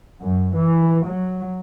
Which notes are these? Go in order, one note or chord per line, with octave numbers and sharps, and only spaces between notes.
F#2
E3
F#3